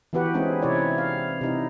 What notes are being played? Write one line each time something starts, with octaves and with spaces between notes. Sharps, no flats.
E3 B3 F#4 G4 B4 F#5
G#3 C4 C#4 D#4 E4 G#4
C3 C4 E4 C#5 D5
F5
C3 D#4 E4